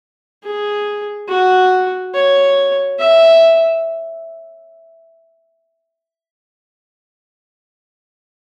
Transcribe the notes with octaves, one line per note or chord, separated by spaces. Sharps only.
G#4
F#4
C#5
E5